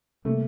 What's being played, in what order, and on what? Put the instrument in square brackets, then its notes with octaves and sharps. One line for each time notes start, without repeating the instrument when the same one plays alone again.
[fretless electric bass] C3 G3 A#3 [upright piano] A3